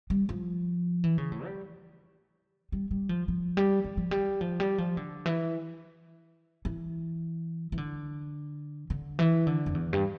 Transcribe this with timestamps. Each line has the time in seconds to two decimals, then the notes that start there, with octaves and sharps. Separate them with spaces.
0.10 G3
0.29 F3
1.04 E3
1.18 C#3
1.32 A2
1.45 G3
2.72 G3
2.91 G3
3.09 F3
3.28 F3
3.57 G3
3.84 G3
3.97 F3
4.11 G3
4.41 F3
4.60 G3
4.78 F3
4.97 D3
5.26 E3
6.65 E3
7.72 E3
7.78 D3
8.90 D3
9.19 E3
9.47 D3
9.66 F2
9.74 E2
9.93 G2